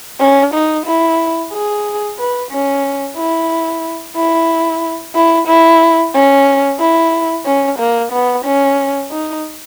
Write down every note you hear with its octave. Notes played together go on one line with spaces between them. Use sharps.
C#4
D#4
E4
G#4
B4
C#4
E4
E4
E4
E4
C#4
E4
C#4
A#3
B3
C#4
D#4